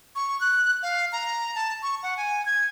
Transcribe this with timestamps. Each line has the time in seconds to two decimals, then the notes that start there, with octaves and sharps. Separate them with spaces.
0.16 C#6
0.41 F#6
0.83 F5
1.12 A#5
1.55 A5
1.82 C#6
2.03 F#5
2.17 G#5
2.46 G#6